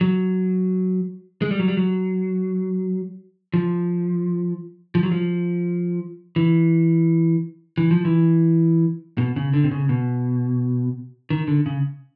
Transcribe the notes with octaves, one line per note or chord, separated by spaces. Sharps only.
F#3
G#3
G3
F#3
G3
F#3
F3
F3
F#3
F3
E3
E3
F3
E3
B2
C#3
D3
C3
C#3
B2
D#3
D3
C#3